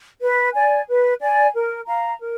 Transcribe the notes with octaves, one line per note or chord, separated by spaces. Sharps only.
B4
D5 G#5
B4
D5 G#5
A#4
F5 A#5
A#4